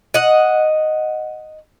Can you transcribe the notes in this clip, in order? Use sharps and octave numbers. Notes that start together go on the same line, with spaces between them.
D#5 F#5